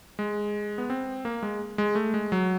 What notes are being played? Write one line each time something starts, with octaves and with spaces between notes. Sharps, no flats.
G#3
B3
C4
A#3
G#3
G#3
A3
G#3
F#3